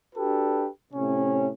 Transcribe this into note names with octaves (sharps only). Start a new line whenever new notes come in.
D4 F#4 G4 A4 B4
A2 C3 C#4